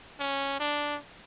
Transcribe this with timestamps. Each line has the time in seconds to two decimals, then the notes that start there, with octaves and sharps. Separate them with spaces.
0.20 C#4
0.60 D4